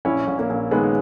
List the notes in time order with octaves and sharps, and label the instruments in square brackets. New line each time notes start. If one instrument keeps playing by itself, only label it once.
[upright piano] A#1 C#4 E4
A#1
A#3 C#4
A#1
D#3 G#3 B3